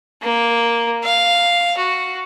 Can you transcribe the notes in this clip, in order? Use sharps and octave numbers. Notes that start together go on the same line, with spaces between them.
A#3
F5
F#4